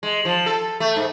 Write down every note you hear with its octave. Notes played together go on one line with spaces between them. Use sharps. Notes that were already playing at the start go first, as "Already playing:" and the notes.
G#3
F3
A4
A3
G#2